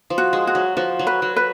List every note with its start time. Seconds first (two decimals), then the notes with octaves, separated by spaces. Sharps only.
0.10 F3
0.18 F#4
0.33 G#3
0.47 F#4
0.55 F#3
0.77 F3 F#4
0.99 F#3
1.07 B4
1.22 F#3
1.36 B4